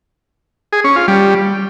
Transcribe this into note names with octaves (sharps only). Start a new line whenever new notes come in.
G#4
C#4
F4
G3